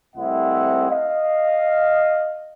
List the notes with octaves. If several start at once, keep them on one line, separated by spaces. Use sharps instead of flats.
C2 A3 C4 E4 D#5 F#5
D#5 F5